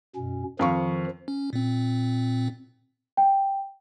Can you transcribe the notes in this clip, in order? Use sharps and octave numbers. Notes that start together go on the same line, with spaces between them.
F#2 B2 C#4
F2 D#3 F3 F5 C#6
C#4
A#2 C4
G5